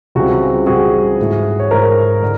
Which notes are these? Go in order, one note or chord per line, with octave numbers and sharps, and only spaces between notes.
C#2 C#3 E3 G3 C4 F#4
C#2 C#3 E3 G3 C4 F#4 G#4
G#2 E3 A3
C#5
G#2 E3 A3 A#4 C5
D3